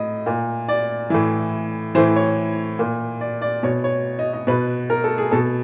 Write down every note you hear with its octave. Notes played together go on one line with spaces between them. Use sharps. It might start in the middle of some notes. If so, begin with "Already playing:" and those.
Already playing: A2 D#5
A#2
D5
A2 E3
A2 E3 C5
C#5
A#2
D5
D5
B2 C#5
C#5
D#5
D#5
B2 B4
A#4
A4
G#4
B2 A4